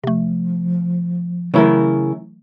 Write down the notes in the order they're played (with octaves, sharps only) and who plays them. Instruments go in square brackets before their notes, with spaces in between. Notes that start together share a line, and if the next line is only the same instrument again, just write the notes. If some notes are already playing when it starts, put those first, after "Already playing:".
[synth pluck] C3 A3 [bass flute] F3
[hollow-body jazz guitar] C#3 E4 A#4 [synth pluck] E3 F#3 A3